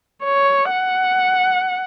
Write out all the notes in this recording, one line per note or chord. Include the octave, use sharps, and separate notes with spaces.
C#5
F#5